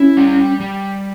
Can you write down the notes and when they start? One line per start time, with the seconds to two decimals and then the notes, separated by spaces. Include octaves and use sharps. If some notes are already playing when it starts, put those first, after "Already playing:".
Already playing: C#4 E4
0.17 G3
0.60 G3